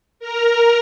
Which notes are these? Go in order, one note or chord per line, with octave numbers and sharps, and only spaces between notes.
A#4 A#5